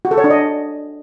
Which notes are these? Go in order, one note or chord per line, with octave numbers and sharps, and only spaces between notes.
F#4
A4
C#5
D4
D#5